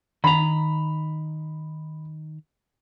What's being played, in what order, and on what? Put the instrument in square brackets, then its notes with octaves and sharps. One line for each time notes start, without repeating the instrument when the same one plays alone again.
[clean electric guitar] D#3 A#5 [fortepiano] B5